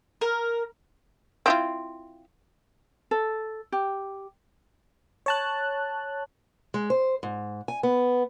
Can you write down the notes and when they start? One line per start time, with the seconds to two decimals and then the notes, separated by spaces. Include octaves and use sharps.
0.21 A#4
1.46 C4 E4 F4
3.11 A4
3.72 G4
5.26 C#5 A5 F#6
6.74 G#3
6.90 C5
7.23 G#2
7.68 G#5
7.83 B3